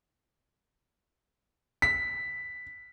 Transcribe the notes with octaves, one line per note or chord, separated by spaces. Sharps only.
B6